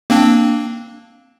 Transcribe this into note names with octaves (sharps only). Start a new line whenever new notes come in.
A#3 C4 D4